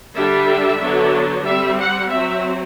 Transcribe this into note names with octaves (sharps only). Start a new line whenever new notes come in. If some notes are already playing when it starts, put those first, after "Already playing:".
D3 G3 D4 E5
D3 F#3 B3 D4
G3 C4 E5
F#5
F#3 C4 E5